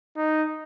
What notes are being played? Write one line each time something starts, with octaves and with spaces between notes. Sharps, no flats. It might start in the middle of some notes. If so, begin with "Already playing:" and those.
D#4